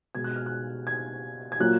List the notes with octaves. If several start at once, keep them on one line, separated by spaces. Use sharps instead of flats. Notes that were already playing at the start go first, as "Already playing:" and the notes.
B2 G#3 G#6
F#6
F6
F#6
G#6
G#6
A#2 F#3 A#3 F#6